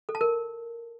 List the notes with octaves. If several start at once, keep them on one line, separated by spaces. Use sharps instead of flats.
A4
A5
A#4